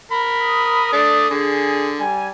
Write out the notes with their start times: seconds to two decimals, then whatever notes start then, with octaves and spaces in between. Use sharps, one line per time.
0.12 A#4 B5
0.42 D#6
0.93 A3 D4 D5
1.30 D3 G#4
1.98 G3 G#5